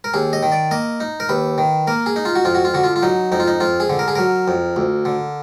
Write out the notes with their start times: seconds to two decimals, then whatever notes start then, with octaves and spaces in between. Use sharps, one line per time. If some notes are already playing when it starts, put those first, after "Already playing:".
0.04 A#4
0.14 D#2 G#4
0.33 D#5
0.43 D#3
0.52 D5
0.71 A#3 D#5
1.00 D#4
1.20 A#4
1.29 D#2 B4
1.58 D#3
1.87 A#3 A#4
2.06 G#4
2.16 D#4
2.25 F4
2.35 F#4
2.45 F2 F4
2.55 F#4
2.65 F4
2.74 D3 F#4
2.83 F4
2.96 F4
3.03 F#3 D#4
3.32 F2 D#4
3.40 F4
3.48 D#4
3.60 F2 F4
3.80 G#4
3.90 D3
3.99 A#4
4.08 G#4
4.15 F#3 A#4
4.48 F2
4.76 D2
5.05 D3